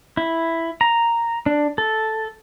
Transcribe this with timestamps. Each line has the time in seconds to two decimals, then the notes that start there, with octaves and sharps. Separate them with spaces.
0.17 E4
0.81 A#5
1.46 D4
1.78 A4